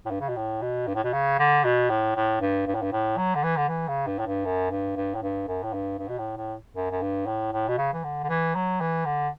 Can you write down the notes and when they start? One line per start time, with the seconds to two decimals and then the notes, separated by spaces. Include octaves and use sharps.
0.06 A2
0.11 G2
0.21 C#3
0.29 B2
0.36 A2
0.62 B2
0.87 G2
0.95 A2
1.04 B2
1.13 C#3
1.39 D3
1.64 B2
1.90 A2
2.16 A2
2.41 G2
2.67 G2
2.75 A2
2.82 G2
2.92 A2
3.18 F#3
3.35 D3
3.43 E3
3.57 D3
3.69 E3
3.88 C#3
4.07 G2
4.19 A2
4.26 G2
4.45 F#2
4.71 G2
4.96 G2
5.15 A2
5.22 G2
5.48 F#2
5.63 A2
5.73 G2
5.99 G2
6.09 B2
6.19 A2
6.37 A2
6.76 F#2
6.91 F#2
7.02 G2
7.27 A2
7.53 A2
7.68 B2
7.78 C#3
7.94 E3
8.04 D3
8.24 D3
8.29 E3
8.55 F#3
8.81 E3
9.06 D3